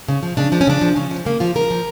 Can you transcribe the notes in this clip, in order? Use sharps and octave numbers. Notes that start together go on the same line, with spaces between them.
C#3
F3
C#3 D4
F3 D4
C#4
C#3 D4
F3
C#3 C#4
F3
C#3 A#3
F3 F4
C#3 A#4
F3